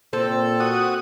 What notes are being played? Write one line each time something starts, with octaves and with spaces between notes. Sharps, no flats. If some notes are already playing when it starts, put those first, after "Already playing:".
A#2 C4 A4
F#4 D#6